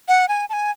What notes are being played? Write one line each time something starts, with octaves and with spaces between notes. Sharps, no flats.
F#5
G#5
A5
G#5